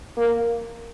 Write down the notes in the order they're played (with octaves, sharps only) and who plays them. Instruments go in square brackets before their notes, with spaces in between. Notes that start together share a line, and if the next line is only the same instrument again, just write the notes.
[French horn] A#3